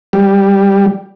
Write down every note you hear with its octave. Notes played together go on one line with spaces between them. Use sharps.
G3